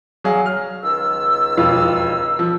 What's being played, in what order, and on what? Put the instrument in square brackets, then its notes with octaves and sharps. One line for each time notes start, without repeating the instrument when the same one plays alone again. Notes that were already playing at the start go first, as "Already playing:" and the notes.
[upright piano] F#3 G#4 F5
F6
[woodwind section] C#2 D#3 E6
[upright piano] E1 F2 F4
F3